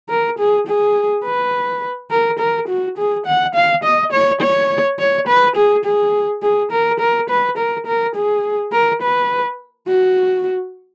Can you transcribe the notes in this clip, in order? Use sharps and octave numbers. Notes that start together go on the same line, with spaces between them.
A#4
G#4
G#4
B4
A#4
A#4
F#4
G#4
F#5
F5
D#5
C#5
C#5
C#5
B4
G#4
G#4
G#4
A#4
A#4
B4
A#4
A#4
G#4
A#4
B4
F#4